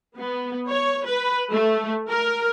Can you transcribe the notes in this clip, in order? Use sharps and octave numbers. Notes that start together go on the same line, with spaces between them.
B3
C#5
B4
A3
A#4